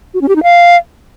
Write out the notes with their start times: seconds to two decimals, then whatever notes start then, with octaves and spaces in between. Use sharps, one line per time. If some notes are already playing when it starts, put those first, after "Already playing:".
0.14 F#4
0.21 C#4
0.29 G4
0.36 D#4
0.43 F5